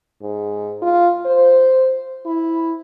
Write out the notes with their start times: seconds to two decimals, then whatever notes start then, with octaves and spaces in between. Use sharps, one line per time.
0.22 G#2
0.82 F4
1.26 C5
2.26 E4